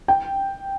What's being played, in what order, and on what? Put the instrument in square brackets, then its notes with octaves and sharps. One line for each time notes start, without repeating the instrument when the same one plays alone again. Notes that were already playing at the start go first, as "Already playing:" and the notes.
[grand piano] G5